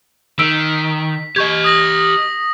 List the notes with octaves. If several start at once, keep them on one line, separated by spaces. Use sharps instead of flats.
D#3 E6 B6 D7
G4 D#5 C#6 G6 G#6
D#6 A#6 F#7